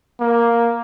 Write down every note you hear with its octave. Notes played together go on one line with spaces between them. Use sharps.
A#3